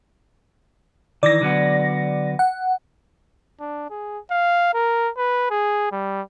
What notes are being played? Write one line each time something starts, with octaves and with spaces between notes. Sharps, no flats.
D#3 E3 D5 A#6
D3 F#3 B3
F#5
D4
G#4
F5
A#4
B4
G#4
G3